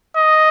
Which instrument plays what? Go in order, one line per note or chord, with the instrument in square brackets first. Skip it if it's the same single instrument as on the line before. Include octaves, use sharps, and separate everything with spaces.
[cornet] D#5